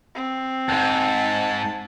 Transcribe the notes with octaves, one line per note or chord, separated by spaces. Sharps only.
C4
E2 G#2 A5